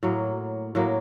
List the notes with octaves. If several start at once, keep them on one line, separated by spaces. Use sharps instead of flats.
A2 F#3 A#3
A2 F#3 A#3